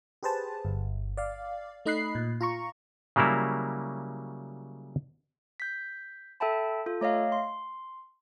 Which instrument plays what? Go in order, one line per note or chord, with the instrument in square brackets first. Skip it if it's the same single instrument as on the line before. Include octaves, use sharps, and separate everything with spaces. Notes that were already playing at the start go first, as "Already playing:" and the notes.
[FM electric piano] G4 G#4 B4 C5 A5
G1
D5 F5
A3 D#4 D#5 B5 F#6 C7
A#2
F4 A#5 C#6
[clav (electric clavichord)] C#3 F#3 G3 A#3 E4
[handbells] G6 B6
A4 E5 G5 A5 B5
F4 A4
A3 C#5 D#5 F5
C6